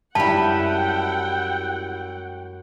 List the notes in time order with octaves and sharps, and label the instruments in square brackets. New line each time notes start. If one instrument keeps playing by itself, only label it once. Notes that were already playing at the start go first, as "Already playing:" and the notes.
[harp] F#2 G#3 C#7 [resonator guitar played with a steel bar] G3 E4 [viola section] F#5 G5 [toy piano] A5